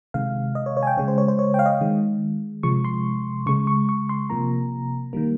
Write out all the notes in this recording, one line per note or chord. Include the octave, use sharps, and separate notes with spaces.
C3 D#3 G#3 F5
D#5
C#5
C#5
G#5
G5
C#3 G#3 C#5
C5
C#5
C5
C#5
G5
F5
D#5
F5
D#3 G#3
C3 F3 G#3 C#6
C6
C#3 G#3 C#6
C#6
C#6
C6
C3 F3 A#3 A#5
D#3 G3 A#3